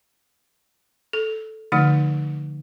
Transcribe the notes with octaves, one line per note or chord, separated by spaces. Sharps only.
A4
D3 F3 A3 D#4